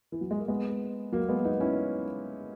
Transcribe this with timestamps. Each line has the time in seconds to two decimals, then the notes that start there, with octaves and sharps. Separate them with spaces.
0.12 E3
0.21 F#3
0.31 G#3
0.39 A#3
0.48 G#3 B3
1.12 F#3 A#3
1.29 G#3 B3
1.45 B3 D#4
1.60 C#4 E4